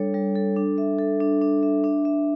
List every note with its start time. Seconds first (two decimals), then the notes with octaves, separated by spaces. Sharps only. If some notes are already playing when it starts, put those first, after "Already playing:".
Already playing: G3 D4 A4 C#5
0.14 G3
0.35 A4
0.56 D4
0.78 E5
0.99 A4
1.20 D4
1.42 D4
1.63 E5
1.84 D4
2.05 E5